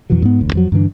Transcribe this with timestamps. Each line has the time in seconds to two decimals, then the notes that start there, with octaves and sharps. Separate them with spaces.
0.10 F2 B2 E3 F#3
0.22 G#2 B3
0.39 E1 D2
0.53 F2 F3 F#3
0.72 G2 D3 E3 D4